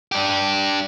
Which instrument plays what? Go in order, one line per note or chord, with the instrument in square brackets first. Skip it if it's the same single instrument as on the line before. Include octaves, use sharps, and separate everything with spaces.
[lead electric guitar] D4 G4